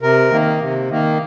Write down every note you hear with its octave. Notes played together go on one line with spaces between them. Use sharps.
C3 A#4
D#3 A#3
C3
D#3 A#3